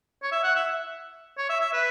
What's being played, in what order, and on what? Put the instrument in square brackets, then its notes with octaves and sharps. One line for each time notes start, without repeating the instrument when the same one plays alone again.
[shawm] C#5
E5
F#5
E5
C#5
E5
E5
B4